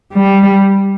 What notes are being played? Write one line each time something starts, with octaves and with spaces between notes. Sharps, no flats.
G3